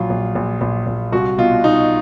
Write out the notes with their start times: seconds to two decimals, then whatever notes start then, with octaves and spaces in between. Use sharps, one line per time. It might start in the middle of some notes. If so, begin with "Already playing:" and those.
Already playing: A#1 F#3 F4
0.10 A#1
0.35 A#1
0.61 A#1
0.87 A#1
1.12 C2 F#4
1.38 B2 F4
1.63 B2 D#4